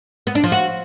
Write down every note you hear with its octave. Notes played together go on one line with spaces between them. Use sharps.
B3
D4
F3
F#4